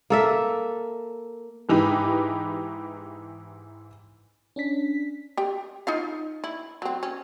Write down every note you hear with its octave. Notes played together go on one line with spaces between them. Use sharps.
A#3 A4 E5
G#2 E3 D#4 G4 B4
C#4 D4 B6
G4 G5
D#4 F4 F5
E4
F#3 C4
C#4